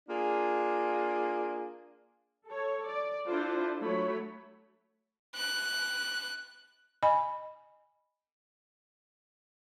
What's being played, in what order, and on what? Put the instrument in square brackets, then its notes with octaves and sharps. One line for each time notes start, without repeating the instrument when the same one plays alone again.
[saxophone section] A#3 D4 F4 G#4
[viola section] A4 C#5
D5
D4 E4 F4 A4 C5
F#3 A3 C#5 B5
[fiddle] F#6
[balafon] D#5 G#5 B5